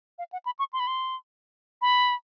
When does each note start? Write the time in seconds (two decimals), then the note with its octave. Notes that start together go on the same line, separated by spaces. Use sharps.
0.19 F5
0.32 F#5
0.45 B5
0.59 C#6
0.73 C6
0.80 B5
0.87 C6
1.82 B5